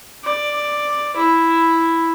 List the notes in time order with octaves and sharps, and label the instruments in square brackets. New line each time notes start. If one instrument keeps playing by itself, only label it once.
[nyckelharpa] D5
E4